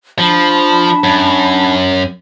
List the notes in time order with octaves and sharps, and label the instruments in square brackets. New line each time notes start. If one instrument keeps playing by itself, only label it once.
[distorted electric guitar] F3 [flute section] D4 A5 B5
[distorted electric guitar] F#2